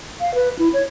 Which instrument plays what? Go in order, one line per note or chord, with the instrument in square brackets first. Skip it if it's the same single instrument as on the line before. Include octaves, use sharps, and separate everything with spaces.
[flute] F5
B4
E4
C#5